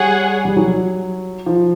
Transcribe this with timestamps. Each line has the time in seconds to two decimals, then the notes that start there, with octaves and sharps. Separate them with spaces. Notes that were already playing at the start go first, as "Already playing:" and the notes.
Already playing: G3 G#4 C#5 F#5
0.45 G3
0.57 F#3
1.46 F3